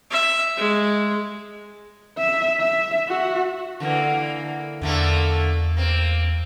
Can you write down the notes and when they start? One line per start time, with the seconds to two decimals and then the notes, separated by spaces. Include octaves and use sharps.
0.11 E5
0.57 G#3
2.18 E5
2.61 E5
3.09 F#4
3.80 D3 E3 A#3
4.82 E2 D3 A3 A#3
5.77 A#3 C4